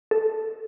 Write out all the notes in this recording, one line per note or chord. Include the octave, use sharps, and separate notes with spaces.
A4